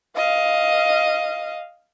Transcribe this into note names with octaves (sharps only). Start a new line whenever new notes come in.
D#5 F5